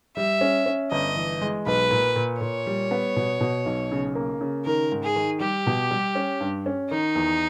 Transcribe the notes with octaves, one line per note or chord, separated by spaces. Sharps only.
G3 E5
C#4
C#4
G1 D#5
E3
G#3
B1 B4
A#2
A#2
A#2 C#5
G3
B3
B2
B2
B1
C#3
A#3
C#3
D#3 A#4
G#2
G#4
D#3
G3 G4
B2
G3
C#4
G2
C#4
D#3 D#4
E2